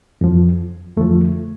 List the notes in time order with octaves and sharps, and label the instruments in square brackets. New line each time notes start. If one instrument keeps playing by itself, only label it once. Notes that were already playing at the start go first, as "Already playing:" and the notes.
[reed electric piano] F2 F3
F2 D3 F3 A3